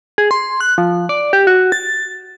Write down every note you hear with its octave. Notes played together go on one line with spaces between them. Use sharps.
G#4
C6
F#6
F3
D5
G4
F#4
A6